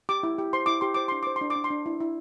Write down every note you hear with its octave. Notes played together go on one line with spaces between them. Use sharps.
G4 D6
E4
G4
C5 C6
E4 D6
G4 C6
C5 D6
D4 C6
C5 D6
C6
D4
D6
D4
C6
D4
E4
E4